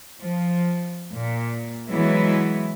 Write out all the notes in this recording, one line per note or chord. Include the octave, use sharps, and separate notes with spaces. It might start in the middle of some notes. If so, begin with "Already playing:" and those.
F3
A#2
E3 F#3 G#3 B3 E4